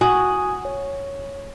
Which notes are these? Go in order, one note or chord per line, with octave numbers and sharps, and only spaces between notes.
F#4 G#5 D#6
C#5